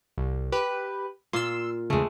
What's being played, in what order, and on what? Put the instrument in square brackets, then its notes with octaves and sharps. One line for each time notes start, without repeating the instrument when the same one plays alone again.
[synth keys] C2
G4 B4
[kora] A#2 F4 [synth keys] C6 E6
[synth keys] E2 C#3 [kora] G#3 A3